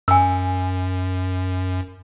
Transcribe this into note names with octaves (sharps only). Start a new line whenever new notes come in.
F#2 G#5 E6